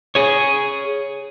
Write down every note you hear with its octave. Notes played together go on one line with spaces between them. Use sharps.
G#4 C#5